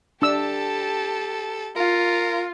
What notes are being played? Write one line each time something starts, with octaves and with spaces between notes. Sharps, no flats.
D4 G4 A4 A5 E6
F4 A#4